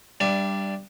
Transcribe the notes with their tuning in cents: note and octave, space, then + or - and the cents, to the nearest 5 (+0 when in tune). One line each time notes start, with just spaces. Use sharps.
G3 +0 D4 +0 E5 +40